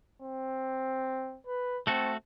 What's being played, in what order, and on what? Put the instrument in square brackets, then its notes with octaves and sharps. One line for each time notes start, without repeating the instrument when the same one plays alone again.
[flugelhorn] C4
B4
[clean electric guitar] A3 F#4 A4 [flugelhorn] C4